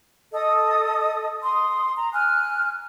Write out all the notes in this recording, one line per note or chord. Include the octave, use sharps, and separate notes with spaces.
A4 D#5 D#6
C6 D#6
A#5
G#5 F6 F#6